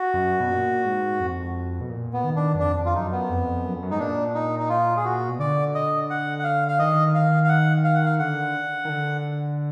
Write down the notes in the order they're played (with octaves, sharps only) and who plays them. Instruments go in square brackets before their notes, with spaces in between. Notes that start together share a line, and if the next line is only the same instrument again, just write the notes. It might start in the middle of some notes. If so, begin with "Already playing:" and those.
Already playing: [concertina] F#4
[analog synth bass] F#2
B2
A#2
G#2
F2
B2
A#2
[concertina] B3
[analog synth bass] D#3
[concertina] D4
[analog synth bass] F#2
[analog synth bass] F2 [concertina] D4
[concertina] F4
[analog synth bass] F#2 [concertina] D#4
[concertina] B3
[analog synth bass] F2
F#2
F2
F#2
[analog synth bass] G#2 [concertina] D#4
[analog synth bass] A#2 [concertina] D4
[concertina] D#4
D#4
F4
G#4
F#4
[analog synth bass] B2
[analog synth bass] D3 [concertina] D5
[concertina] D#5
F#5
F#5
F5
F5
[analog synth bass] D#3 [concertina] D#5
[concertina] F5
F5
F#5
F5
F#5
F5
[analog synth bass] D3 [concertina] F#5
[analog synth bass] D#3
D3